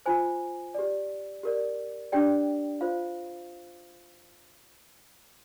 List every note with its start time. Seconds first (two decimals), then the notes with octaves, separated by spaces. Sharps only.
0.06 F4 C5 G#5
0.75 G4 D5
1.43 G4 A#4 D5
2.12 D4 G4 D5 G5
2.81 F4 C5 F5